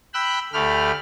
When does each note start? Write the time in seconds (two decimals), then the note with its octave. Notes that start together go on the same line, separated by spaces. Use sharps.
0.14 G5 B5 E6 F#6
0.53 D2 A3 G4 B5 F6